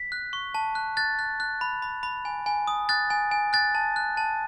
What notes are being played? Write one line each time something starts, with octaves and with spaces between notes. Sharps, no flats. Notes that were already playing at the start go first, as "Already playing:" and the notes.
Already playing: B6
F#6
C#6
A5
F#6
F#6 A6
F#6
F#6
B5
B5
B5
G#5
G#5
D#6
F#6 A6
G#5
G#5
F#6 A6
A5
F#6
A5